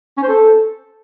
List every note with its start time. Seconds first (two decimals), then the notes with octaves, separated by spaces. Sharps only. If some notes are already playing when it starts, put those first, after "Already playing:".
0.17 C#4
0.23 C5
0.29 A4